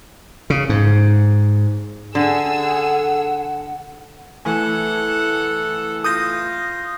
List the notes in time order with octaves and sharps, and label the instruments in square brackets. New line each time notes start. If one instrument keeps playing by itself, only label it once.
[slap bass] C#3
G#2
[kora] D3 [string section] G#4 E6 [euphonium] A4 [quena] F#5
[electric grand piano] E3 A3 G#5 [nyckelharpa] A4 F#5
[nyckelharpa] F4 [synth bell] D#6 G6 A#6